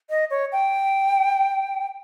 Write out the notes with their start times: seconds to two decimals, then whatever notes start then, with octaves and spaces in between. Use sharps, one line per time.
0.10 D#5
0.31 C#5
0.52 G5